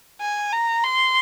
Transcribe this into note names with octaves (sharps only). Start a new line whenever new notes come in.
G#5
A#5
C6